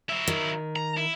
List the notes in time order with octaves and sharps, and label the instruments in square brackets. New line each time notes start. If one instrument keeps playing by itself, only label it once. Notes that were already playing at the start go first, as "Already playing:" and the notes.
[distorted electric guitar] F#3 E4
[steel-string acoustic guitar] D#3
[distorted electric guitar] A#5
E4